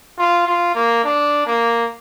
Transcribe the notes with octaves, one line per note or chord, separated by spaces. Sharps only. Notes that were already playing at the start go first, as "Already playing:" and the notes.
F4
F4
A#3
D4
A#3